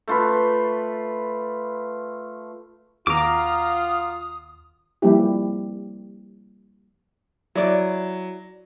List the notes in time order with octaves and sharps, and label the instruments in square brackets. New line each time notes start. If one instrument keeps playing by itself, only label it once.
[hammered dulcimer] A3 F4 B4
[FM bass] D#2 [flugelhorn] F4 [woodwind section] F#4 F5 D#6 [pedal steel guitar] A#5 D6
[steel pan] F3 G3 A#3 C4 E4 G4
[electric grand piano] F#3 [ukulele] E4 D5